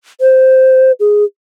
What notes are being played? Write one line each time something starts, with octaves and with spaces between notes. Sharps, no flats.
C5
G#4